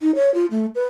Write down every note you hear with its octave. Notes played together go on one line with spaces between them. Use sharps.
D#4
C#5
F4
A3
B4